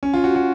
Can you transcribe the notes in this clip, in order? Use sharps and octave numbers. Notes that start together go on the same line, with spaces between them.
C#4
F4
F#4
F#4